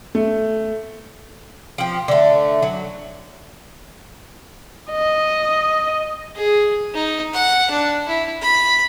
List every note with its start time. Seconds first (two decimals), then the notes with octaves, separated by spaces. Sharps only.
0.15 A3
1.78 F3 G4
2.08 D3 A3
2.62 F#3
4.91 D#5
6.35 G#4
6.94 D#4
7.34 F#5
7.70 D4
8.08 E4
8.41 B5